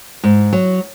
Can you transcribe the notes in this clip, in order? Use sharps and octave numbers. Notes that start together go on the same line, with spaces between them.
G#2
F#3